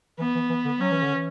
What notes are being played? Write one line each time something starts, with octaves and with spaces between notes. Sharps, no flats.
E3 B3
E3
E3
D3
F#3 C#4
E3
D3
E3